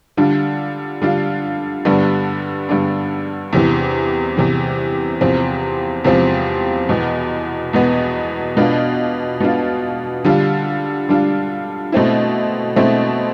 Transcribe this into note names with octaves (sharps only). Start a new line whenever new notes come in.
D3 G3 D4 F4
D3 G3 D4 F4
G2 D3 G3 B3 D4
G2 D3 G3 B3 D4
E2 C3 E3
E2 C3 E3
E2 C3 F3 C4
E2 C3 F3 C4
E2 B2 B3
E2 B2 B3
B2 B3 D4 F4
B2 B3 D4 F4
D3 G3 D4 F4
D3 G3 D4 F4
B2 A3 C4 E4
B2 A3 C4 E4